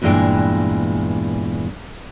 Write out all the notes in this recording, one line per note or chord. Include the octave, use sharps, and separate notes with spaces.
E2 G2 A#2 E3 G#3 G5